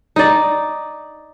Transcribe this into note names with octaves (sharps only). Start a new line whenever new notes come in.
D#4 D5